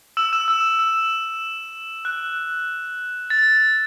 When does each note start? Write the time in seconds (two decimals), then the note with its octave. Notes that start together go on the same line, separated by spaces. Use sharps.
0.17 E6 E7
0.33 E6 E7
0.48 E6
0.79 E6
2.05 F#6
3.30 A6